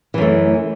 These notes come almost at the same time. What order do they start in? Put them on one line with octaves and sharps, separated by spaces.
E3 F#2 A3